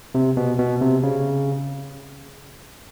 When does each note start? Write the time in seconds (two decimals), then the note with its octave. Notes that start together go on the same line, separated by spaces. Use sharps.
0.15 C3
0.37 B2
0.59 B2
0.81 C3
1.03 C#3